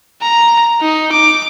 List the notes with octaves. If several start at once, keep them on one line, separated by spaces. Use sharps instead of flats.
A#5
D#4
D6